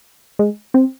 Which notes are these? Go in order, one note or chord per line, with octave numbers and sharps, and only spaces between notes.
G#3
C4